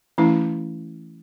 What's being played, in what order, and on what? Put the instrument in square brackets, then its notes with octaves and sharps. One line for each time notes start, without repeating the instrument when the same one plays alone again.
[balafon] E3 A3 C#4 E4